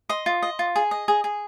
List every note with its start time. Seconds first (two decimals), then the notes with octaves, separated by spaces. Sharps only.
0.09 D#5 C6
0.26 F4
0.42 D#5
0.59 F4
0.76 G#4
0.91 D#5
1.08 G#4
1.24 G#4